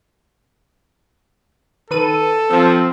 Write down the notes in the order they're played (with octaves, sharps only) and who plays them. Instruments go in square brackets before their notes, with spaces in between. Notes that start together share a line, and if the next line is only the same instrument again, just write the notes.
[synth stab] D#3 B4 D#7 [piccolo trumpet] A4
[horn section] F3 [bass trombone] C4 [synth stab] E6